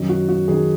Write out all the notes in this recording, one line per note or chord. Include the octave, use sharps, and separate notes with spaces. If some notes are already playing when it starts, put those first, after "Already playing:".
Already playing: F#2 D#3 F#3
F#4
F#4
D#3 F#3 G#4